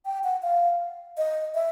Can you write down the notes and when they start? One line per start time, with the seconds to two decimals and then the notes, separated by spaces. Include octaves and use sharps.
0.06 G5
0.24 F#5
0.43 F5
1.18 D#5
1.55 E5